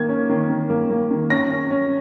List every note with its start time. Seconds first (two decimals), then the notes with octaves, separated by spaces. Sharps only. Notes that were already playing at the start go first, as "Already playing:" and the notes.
Already playing: D#3 A#3 G#6
0.09 C#4
0.29 D#3
0.50 D#3
0.70 A#3
0.90 A#3
1.11 D#3
1.30 C#4 A#6
1.50 C#4
1.71 C#4